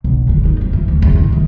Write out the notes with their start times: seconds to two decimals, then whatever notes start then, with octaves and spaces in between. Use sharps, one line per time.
0.04 B1
0.29 D3
0.45 D#4
0.61 F2
0.73 E3
0.88 D2
1.02 E2
1.15 G#1
1.32 D#3